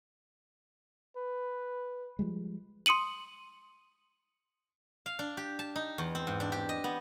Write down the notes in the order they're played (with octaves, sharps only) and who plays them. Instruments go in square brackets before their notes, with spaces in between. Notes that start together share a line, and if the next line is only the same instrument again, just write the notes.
[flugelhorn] B4
[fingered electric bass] F3 G3 G#3
[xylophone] C6 D#6 C#7 D#7 F#7
[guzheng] F5
D4
G4
A5
D#4
E2
C4
G#2
D4
G4
D#5
B3